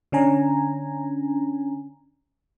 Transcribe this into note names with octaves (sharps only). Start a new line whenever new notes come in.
D3 C#4 D4 G#5 A#5